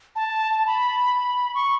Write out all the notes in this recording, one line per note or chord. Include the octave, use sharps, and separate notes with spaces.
A5
B5
C#6